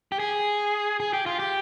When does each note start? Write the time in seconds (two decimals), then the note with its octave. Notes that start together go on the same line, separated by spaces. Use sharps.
0.12 G4
0.19 G#4
1.00 G#4
1.13 G4
1.26 F4
1.39 G4